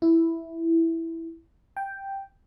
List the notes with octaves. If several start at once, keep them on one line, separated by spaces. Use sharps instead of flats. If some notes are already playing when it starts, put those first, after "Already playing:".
E4
G5